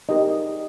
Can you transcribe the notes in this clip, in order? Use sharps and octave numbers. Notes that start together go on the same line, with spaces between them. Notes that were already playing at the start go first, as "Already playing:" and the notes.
D#4 G4 A#4 D#5